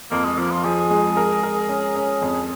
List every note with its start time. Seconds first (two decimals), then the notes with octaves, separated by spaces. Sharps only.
0.11 F2 A#3
0.25 G#3
0.38 F3 A#3
0.51 F4
0.65 F3 G#4
0.90 G#3
1.17 A#4
1.43 A#4
1.69 C#4
1.96 C#4
2.22 F2